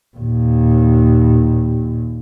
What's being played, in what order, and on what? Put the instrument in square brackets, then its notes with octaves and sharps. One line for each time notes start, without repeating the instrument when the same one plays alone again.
[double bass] D#2 A#2